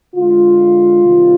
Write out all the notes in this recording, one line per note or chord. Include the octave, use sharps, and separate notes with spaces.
D3 G#3 F4
C3 D#3 G3